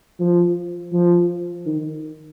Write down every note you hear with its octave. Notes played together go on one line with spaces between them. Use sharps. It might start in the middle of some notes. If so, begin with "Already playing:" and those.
F3
F3
D#3